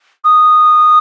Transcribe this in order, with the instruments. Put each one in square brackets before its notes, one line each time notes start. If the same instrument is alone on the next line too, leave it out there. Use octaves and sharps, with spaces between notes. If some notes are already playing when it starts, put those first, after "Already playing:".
[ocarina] D#6